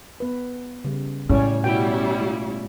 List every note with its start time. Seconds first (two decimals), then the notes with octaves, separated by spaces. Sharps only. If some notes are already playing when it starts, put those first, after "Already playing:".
0.20 B3 B4
0.85 C#3 G3
1.30 A2 G3 C#4 E4 C#5
1.64 B2 G3 C#4 E4 F#4 G5
2.21 G#3 F4